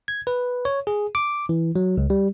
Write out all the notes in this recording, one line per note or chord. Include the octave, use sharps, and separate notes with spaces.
G#6
B4
C#5
G#4
D6
E3
F#3
C#2
G3